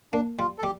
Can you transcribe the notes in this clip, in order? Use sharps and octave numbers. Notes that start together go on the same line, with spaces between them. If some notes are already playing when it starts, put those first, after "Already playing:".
A#3 D4
G3 F4
A4
G3 G4